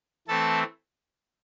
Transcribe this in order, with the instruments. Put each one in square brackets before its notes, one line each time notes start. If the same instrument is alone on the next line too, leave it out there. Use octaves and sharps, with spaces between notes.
[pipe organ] E3 A3 C4 A4 A5